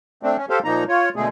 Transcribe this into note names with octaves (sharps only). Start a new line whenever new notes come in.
A3 C4 D4
C#4
G4 A4 C5 F5
A#2 F3 A#3 D#4 A#5
F4 C#5
B2 D3 G#3 A3 G#4